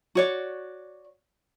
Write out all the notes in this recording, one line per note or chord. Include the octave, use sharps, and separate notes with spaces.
F#4 C#5 D5